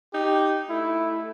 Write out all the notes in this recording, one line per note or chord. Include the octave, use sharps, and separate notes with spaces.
D#4 G4
A3 E4